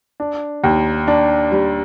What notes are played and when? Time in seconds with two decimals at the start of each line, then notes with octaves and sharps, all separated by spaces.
0.20 D4
0.64 D#2
1.08 D4
1.52 G3